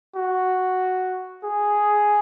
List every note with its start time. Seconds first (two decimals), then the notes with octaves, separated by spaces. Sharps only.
0.16 F#4
1.44 G#4